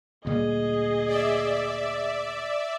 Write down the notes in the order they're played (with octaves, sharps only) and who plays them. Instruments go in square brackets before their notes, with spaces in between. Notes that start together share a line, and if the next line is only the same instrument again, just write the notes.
[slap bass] D2 A#2 G3 [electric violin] G#4 D#5
[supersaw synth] D5 E5